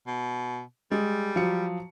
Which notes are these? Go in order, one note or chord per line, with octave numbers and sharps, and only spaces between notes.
B2
G3 G#3
F3 F#3 C#7